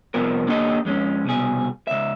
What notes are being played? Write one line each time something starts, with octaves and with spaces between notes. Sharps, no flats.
C2 F2 F3 B3 A#4
A#3 D4 G4 A4 D#5
F2 G#3 C#4
C2 B2 G#4
C#2 E5